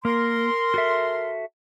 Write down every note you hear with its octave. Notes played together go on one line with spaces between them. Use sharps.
A#3 A#4 C6
F#4 A4 E5